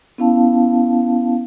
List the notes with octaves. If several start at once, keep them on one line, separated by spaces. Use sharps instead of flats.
B3 C#4 E4 F5 A5